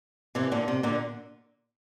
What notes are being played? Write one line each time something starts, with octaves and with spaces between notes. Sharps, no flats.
C3 E3
A#2 D3
C3
A#2 D3